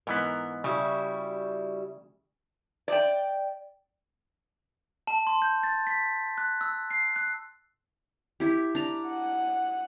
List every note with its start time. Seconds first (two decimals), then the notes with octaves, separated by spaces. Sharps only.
0.07 G#2 E3 B3 A#4
0.64 C#3 G3 E4 F#4
2.88 D5 G5
5.07 A5
5.27 C6
5.42 G6
5.63 A6
5.87 B6
6.38 F#6
6.61 E6
6.90 C7
7.16 F#6
8.40 E4 G4
8.75 D4 A#5
9.08 F#5